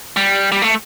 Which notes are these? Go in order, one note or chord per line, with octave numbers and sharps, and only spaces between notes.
G3
G3
A3